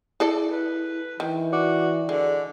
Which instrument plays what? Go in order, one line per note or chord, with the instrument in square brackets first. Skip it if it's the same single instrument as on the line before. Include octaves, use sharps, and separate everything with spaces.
[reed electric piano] E4 [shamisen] G#4 A4 D5
[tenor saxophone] B4
[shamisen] D#3 [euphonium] E3
[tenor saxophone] F#4 [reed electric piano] D5 D6
[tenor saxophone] D3 [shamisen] G#3